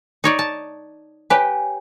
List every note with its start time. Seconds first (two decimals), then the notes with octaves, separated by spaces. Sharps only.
0.24 D#4 C#5 D5
0.39 A5
1.30 G4 B4 C#5 G#5